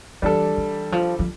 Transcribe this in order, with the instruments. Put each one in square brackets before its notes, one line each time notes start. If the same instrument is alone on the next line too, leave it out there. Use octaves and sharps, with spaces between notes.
[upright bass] E3 [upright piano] G3 D4 A4
[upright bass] E3
F3
F3